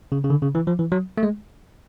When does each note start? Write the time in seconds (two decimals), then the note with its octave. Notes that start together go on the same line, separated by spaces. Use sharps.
0.12 C#3
0.24 C#3
0.30 D3
0.42 C#3
0.55 E3
0.67 F3
0.79 E3
0.92 F#3
1.17 A3
1.23 G#3